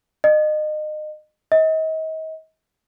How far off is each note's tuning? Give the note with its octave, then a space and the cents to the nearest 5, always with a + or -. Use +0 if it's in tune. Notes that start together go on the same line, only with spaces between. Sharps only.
D#5 -30
D#5 +35